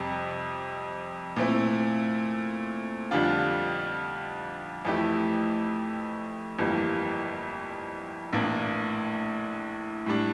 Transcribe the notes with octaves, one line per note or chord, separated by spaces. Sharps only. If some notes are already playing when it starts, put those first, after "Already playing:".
Already playing: F2 C3 G3
A#2 A3 C4 E4
F2 D3 G3 D4 F4
F2 E3 A3 E4 G4
G1 F2 E3 G3 A#3
A#1 A2 E3 A#3 D4
A2 G3 D4